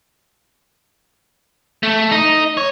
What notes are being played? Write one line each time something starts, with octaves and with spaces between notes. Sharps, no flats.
A3
D#4
C#5